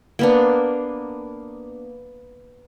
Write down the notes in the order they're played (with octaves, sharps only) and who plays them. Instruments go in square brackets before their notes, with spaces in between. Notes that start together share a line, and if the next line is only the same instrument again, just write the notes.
[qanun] A#3 B3 D4